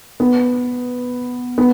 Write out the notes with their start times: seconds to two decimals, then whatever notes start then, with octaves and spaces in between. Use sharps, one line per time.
0.20 B3
1.58 B3